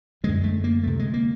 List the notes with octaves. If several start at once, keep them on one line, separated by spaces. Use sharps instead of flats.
F#2 D3 G#3
A3
A#3
D2 C3 A3
G#3
A#3